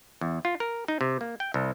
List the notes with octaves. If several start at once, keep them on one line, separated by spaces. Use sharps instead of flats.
E2
F4
A#4
D#4
C3
A#3
G5
C2